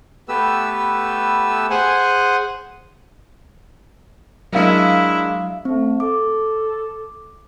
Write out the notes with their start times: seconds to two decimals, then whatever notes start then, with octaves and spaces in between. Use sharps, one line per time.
0.29 A3 B3 G4 B4 E6
1.70 G#4 C5 F#5 G#5
4.53 F#3 G#3 D4 E4 A#4 F5
5.65 A3 C4
6.00 A4 D6